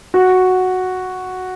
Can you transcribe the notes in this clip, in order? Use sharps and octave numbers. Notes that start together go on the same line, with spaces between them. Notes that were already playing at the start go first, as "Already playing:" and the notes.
F#4